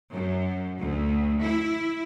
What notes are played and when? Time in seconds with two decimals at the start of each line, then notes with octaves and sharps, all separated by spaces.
0.11 F#2
0.79 D2
1.42 E4